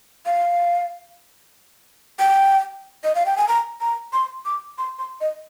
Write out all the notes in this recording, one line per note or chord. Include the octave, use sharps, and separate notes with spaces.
F5
G5
D#5
F5
G5
G#5
A#5
A#5
C6
D6
C6
C6
D#5